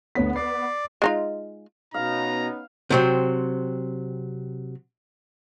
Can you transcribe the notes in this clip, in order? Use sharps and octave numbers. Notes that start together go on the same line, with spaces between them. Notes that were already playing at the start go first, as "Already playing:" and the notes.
D2 B3 C#5 B6
D5 C7
G#3 D#4 F4
B2 B3 C#4 D#4 F5 A#5
C3 F#3 C4